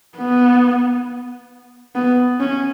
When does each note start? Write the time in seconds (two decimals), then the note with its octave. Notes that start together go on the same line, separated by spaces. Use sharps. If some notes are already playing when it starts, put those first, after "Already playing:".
0.18 B3
1.95 B3
2.40 C#4